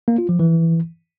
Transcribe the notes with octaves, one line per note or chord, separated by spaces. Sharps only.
A#3
F4
F3
E3